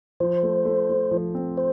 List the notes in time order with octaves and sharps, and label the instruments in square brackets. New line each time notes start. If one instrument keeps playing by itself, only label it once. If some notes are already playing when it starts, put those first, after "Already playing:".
[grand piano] F3 [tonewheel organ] C5
[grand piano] A3
A3
A3
F3
C4
[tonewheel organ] C5